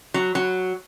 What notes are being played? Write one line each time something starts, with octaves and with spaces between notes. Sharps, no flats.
F#3
F#3